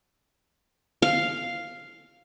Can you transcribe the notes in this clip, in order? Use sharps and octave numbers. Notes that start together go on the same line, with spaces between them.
F5